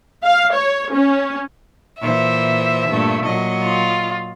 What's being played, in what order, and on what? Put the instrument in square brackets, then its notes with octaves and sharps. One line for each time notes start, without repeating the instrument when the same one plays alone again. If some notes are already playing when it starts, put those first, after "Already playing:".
[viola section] F5
C#5
C#4
[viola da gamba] A#2 E3 C5 [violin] E5
[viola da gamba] G2 A#2 A3
A#2 F#3 D#5
[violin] F4